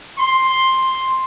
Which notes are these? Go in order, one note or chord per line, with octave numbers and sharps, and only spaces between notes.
C6